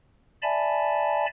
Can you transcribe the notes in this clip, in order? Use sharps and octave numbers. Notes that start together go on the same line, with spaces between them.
D5 E5 G#5 A5 B5